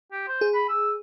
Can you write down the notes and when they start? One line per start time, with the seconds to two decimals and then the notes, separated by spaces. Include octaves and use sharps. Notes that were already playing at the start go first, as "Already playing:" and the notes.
0.12 G4
0.28 C5
0.41 G#4
0.54 B5
0.69 E6